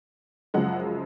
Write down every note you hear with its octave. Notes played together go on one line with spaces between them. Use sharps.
F#2 C#3 F3 G#3 F#5